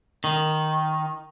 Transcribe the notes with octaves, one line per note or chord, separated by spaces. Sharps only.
D#3